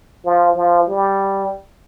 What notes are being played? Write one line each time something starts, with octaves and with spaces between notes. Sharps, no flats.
F3
F3
G3